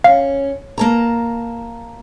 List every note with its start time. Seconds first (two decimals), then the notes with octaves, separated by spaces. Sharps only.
0.04 C#4 F5
0.78 A#3 A5 A#5